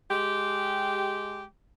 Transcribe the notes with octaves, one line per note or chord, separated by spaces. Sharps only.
G#3 G4